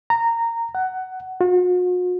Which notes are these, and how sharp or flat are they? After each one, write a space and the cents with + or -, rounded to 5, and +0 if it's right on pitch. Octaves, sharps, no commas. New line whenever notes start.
A#5 -15
F#5 +15
F#4 -45